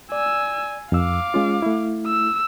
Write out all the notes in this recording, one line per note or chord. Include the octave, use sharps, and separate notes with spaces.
D5 G#5 E6
F2 F5 D6 E6
G#3 C#4 F4
A3 E4
E6